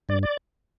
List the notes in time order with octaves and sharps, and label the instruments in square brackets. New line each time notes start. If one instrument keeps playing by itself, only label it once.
[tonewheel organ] G2 D5
D5